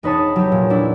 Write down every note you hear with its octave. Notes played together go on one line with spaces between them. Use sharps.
E1 D#4 B4 C#5 A5 D#6
F#3 G4 B5
A#2
F#3 D4 E4